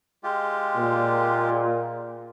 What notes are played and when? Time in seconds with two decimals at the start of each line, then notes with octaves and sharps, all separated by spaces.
0.24 G#3 F4 G4
0.76 A#2